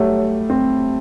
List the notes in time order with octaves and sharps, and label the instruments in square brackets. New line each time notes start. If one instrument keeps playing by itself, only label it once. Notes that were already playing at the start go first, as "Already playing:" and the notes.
Already playing: [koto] F#3 [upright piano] G3 A3
[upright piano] C4